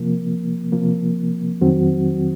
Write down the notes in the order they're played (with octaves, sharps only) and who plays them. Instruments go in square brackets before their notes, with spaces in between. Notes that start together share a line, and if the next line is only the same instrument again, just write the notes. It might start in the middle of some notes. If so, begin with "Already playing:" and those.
Already playing: [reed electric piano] C3 F3 A#3
C3 F3 A#3
F2 D#3 F#3 C4 F#4